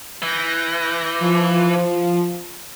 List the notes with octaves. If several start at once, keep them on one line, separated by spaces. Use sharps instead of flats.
E3 G6 A#6
F3